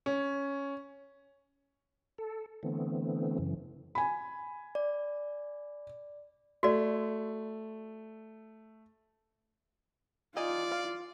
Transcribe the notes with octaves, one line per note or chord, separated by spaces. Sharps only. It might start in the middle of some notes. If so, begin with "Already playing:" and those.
C#4
A4
D3 E3 A3 B3 C4
F#2 C#3 E3
G#5 B5
D5
A3 F#4 D5
D#4 F4 D5 G#5
F5